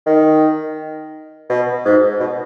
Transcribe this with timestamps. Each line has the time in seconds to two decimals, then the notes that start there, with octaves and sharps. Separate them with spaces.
0.06 D#3
1.49 B2
1.85 G#2
2.20 B2